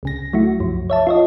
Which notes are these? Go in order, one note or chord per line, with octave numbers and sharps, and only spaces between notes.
C#2 C#3 A#6
F#3 A3 E4 F#4
C2 F#2 F3
C#5 E5 A5
F4 C#5 D#5